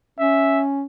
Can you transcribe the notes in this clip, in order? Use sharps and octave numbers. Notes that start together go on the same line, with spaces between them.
C#4 E5